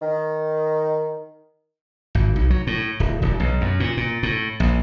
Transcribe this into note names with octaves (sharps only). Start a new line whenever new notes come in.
D#3
G#1
B1
F#3
A2
D1
E1
B1
F#2
A#2
A#2
A2
A#1